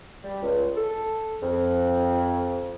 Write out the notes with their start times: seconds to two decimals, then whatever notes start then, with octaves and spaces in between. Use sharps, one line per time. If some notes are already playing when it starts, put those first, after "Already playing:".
0.24 G3
0.43 C#2
0.77 A4
1.43 F2